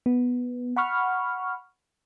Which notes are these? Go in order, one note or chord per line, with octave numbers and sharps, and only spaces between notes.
B3
F#5 B5 C#6 F6